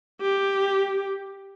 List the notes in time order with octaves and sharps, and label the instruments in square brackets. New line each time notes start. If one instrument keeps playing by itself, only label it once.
[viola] G4